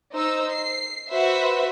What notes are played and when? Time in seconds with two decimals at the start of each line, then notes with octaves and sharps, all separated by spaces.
0.13 D#4 C5 E6
0.52 C7
1.11 F#4 B4 C5 E5